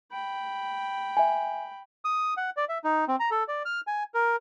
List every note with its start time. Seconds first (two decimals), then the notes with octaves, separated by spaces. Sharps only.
0.12 G5 B5
1.17 E5 G#5
2.05 D#6
2.37 F#5
2.57 D5
2.69 E5
2.84 D#4
3.08 C4
3.20 A#5
3.31 A4
3.48 D5
3.65 F6
3.87 G#5
4.14 A#4